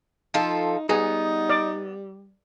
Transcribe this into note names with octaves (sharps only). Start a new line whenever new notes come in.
F3 D#4 F4 A4
G3 B3 D#4 G#4
D5